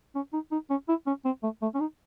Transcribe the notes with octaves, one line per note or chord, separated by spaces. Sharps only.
C#4
D#4
D#4
C#4
E4
C#4
C4
A3
A3
C#4
D#4